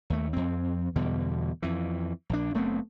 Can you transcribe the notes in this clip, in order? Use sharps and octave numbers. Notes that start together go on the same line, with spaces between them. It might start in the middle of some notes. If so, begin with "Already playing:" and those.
D#2 A3
F2 C4
E2 B2 D3 G3
F2 E3
A#1 D4
F#1 A3 B3 C4